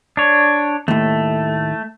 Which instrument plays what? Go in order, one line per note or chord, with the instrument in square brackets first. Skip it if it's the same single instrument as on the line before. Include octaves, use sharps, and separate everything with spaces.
[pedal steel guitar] D4 C#5
[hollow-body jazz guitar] D#2 A2 [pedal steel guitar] A3